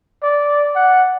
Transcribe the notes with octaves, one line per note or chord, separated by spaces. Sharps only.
D5
F#5